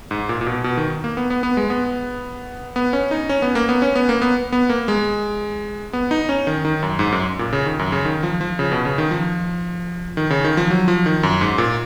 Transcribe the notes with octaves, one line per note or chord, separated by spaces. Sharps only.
G#2
A#2
A#2
B2
B2
D#3
A#3
B3
B3
B3
G#3
B3
B3
C#4
D#4
C#4
B3
A#3
B3
C#4
B3
A#3
B3
B3
A#3
G#3
B3
D#4
C#4
D#3
D#3
F#2
G#2
F#2
A#2
C#3
D#3
F#2
C#3
D#3
F3
F3
C#3
B2
C#3
D#3
F3
D#3
C#3
D#3
F3
F#3
F3
D#3
F#2
G#2
A#2